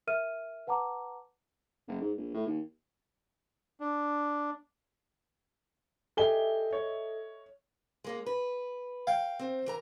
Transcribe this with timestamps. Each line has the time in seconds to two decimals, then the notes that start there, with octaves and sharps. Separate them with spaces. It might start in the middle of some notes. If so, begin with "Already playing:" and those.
0.07 A#4 E5 F6 D#7
0.67 B4 F#5 A5 A#5 D6
1.88 F#1
2.01 G#2
2.17 A#1
2.34 A2
2.47 D#2
3.80 D4
6.17 G4 A4 D#5 E5 G#5 G7
6.73 C#5
8.04 G#3 A#3 C#4
8.26 B4
9.07 F5 G5
9.39 C4 C5
9.66 E3 A#4 A#5